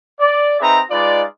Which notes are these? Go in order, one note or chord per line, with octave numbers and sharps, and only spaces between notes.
D5
C4 D#4 G#4 B4 E5 A#5
G#3 D#4 F4 B4 D5